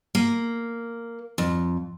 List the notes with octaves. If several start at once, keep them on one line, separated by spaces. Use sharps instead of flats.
A#3
F2